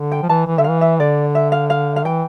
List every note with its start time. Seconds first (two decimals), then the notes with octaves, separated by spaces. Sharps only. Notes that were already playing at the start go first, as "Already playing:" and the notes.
Already playing: D3
0.12 G5
0.23 F3
0.29 E3 A5
0.47 E3
0.58 D3 E5
0.64 E3 F5
0.81 E5
1.00 D3 D5
1.35 E5
1.52 F5
1.70 F5
1.96 F5
2.05 E3 G5